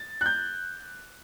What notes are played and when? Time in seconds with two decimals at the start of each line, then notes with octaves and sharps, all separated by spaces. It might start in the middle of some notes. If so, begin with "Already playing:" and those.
Already playing: A6
0.21 F#6
0.26 G6